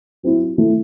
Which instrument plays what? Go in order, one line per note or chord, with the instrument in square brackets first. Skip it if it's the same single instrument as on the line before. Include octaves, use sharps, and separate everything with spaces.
[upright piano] F#3 C4 E4
E3 A3 E4